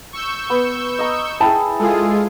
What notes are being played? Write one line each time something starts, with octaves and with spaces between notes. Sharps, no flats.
C#6 E6 G6
B3
D#5 A#5
E4 G#4 G5 A5
G#3 F4 G#4 A4 D#6